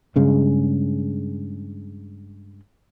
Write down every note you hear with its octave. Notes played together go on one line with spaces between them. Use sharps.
G2 C#3 G#3